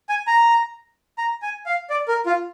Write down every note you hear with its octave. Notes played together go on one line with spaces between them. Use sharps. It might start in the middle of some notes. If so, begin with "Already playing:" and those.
G#5
A#5
A#5
G#5
F5
D5
A#4
F4